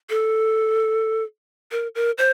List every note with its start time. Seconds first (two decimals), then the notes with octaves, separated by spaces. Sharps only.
0.10 A4
1.71 A#4
1.95 A#4
2.18 C5